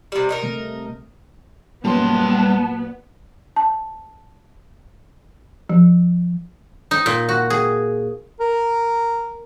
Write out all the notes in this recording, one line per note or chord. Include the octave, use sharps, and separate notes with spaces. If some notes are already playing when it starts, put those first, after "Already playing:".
C3 G3
D#4 F#4 A#4
C3 A3
F#2 A#2 G3 B3 A5 C6
A5
F3
D#4
A#2
F#4
G#4
A#4